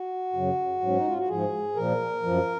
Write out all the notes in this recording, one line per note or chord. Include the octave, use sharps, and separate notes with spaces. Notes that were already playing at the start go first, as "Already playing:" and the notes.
Already playing: F#4
F#2 C#3 F#3
G#2 F#3 C#4
D#4
F4
F#4
G#2 F3 G#4
A#2 F3 A#4
F#2 F3